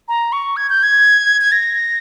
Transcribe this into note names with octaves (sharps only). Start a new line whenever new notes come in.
A#5
C#6
G#6
G6
G#6
G#6
A#6